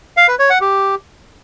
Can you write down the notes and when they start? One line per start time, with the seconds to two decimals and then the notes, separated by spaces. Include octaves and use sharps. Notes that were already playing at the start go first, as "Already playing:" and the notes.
0.17 F5
0.28 B4
0.39 C#5
0.50 F#5
0.61 G4